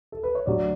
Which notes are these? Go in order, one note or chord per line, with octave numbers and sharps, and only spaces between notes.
A4
B4
C#5
D2 D3 F#3 D5